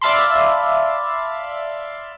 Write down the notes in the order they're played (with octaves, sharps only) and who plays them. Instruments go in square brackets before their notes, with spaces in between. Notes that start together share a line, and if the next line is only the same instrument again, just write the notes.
[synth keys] D5 E5 F5 A5 B5 C6